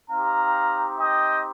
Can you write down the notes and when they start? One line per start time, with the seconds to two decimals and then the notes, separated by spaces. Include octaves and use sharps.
0.10 C4 D#4 G4 F5 A#5
0.99 D#5 G5